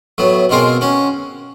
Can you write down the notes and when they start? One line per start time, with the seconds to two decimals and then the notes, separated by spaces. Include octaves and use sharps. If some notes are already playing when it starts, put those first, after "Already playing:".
0.18 A2 F#3 B3
0.49 B2 G#3 C4 F4 A#4
0.81 C#4 F#4